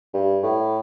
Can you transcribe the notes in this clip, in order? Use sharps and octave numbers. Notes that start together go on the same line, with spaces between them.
G2
A2